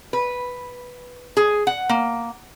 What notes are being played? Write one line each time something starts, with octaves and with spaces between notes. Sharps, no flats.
B4
G#4
F#5
A#3